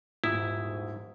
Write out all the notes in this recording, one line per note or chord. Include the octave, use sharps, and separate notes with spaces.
D#1 G#2 E4 D#6